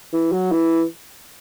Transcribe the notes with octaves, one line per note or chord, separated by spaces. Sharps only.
E3
F#3
E3